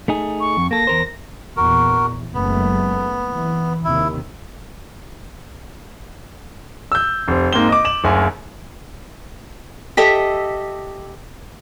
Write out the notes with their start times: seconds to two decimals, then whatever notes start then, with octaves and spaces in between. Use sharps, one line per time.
0.08 A3 D#4 G#4
0.40 C#6
0.57 F2
0.71 A#3 A4 A#6
0.87 E2 A#4 C5
1.57 A#1 E2 F#4 A#4
2.34 F#1 G#3 A3 B3
3.27 E3
3.85 D#2 C3 D#3 E4
6.92 E6 G6
7.28 F1 C5
7.53 G#2 A#3 C4 G7
7.69 D#5 D6
7.85 E7 F#7
8.04 F#1 D2 G#5
9.97 G4 A4 D#5 E5